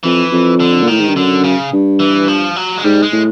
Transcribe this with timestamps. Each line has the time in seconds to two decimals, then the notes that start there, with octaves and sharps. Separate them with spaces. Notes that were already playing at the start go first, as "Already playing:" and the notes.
0.03 F2 E3
0.32 F2
0.60 D3
0.83 A#2
0.87 A2 D#3
0.99 G#2
1.08 G2
1.16 F#2 D3
1.44 C#3
1.73 G2
2.00 E3
2.28 F3
2.56 F#3
2.77 G#3
2.84 G#2 G3
3.03 G#3
3.12 A2